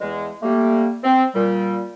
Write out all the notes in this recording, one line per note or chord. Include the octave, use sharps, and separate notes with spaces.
E2 G#3
G3 A3 A#3
C4
A#2 G3